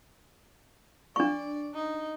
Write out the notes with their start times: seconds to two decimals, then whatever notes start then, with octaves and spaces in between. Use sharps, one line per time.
1.16 D4 D5 C#6
1.75 D#4